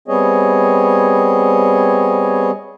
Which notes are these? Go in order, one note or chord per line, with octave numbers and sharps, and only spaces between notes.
G3 B3 C4 G#4 C#5 D#5